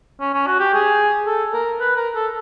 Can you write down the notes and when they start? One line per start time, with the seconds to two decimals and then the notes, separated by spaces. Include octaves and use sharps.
0.20 C#4
0.34 C#4
0.47 F#4
0.60 G4
0.74 G#4
1.26 A4
1.54 A#4
1.80 B4
1.97 A#4
2.15 A4